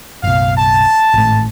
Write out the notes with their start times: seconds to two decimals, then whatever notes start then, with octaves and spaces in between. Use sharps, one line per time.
0.23 F#1 B1 F5
0.58 A5
1.14 G#1 A2